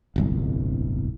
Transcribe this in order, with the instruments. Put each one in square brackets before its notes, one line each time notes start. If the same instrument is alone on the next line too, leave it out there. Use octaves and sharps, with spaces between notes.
[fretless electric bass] D1 G1 C2